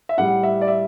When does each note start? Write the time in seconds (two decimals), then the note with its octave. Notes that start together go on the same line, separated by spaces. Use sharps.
0.09 E5
0.18 A2 G3 F#5
0.43 E5
0.61 D5
0.68 E5